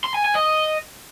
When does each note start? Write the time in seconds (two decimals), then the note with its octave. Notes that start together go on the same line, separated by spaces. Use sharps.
0.04 C6
0.14 G#5
0.25 G#5
0.35 D#5